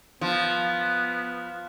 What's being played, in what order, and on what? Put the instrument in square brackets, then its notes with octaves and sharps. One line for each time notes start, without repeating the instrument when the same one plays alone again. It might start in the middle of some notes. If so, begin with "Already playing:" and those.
[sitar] F3 [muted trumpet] B3